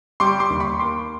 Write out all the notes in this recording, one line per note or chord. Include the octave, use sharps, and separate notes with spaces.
G3 C6 D6
C6 D6
D#2
B5 C#6
A#3 C6 D6